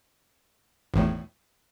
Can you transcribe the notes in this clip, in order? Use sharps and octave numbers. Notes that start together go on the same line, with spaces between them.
G#1 E2 A2